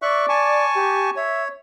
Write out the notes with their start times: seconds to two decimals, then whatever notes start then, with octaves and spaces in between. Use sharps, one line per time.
0.02 D5 E5 C#6 F#6
0.29 G#5 A5 C#6
0.75 G4
1.16 C#5 E5